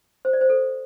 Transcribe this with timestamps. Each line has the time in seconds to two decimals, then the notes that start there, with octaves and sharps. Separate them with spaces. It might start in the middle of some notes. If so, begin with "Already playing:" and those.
0.25 C5
0.33 D5
0.41 C5
0.50 A4